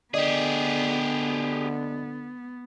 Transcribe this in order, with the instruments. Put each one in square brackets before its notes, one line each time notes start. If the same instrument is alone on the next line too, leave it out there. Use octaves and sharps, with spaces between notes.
[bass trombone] D3 [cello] B3 [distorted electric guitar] G4 G#4 [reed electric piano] D5 D#5